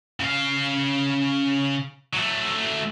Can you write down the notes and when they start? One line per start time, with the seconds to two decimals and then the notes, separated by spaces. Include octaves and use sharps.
0.20 C#3 F5
2.14 F#3 A3